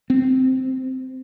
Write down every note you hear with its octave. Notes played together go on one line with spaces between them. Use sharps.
C4